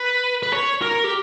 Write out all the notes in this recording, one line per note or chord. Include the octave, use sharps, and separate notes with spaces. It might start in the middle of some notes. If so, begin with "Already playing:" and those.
Already playing: B4
B4
C#5
A#4
G4